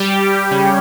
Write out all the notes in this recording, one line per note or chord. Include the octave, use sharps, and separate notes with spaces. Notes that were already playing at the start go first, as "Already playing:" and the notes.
Already playing: G3 G4
C#3 C#4